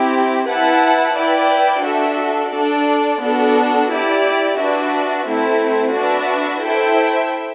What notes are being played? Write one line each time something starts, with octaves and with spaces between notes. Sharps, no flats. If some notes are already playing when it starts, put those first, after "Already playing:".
Already playing: C4 E4 G4
E4 B4 F#5 A5
E4 B4 D5 G5
D4 F#4 A4 E5
D4 A4 D5
B3 D4 F#4 A4
E4 G4 D5
D4 F#4 B4 E5
A3 C4 E4
D4 F#4 B4 E5
E4 A4 C5 E5 G5